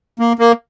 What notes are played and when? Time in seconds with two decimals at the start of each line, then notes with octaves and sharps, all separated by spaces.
0.19 A#3
0.39 A#3